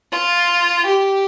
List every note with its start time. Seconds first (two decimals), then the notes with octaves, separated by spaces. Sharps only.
0.12 F4
0.86 G4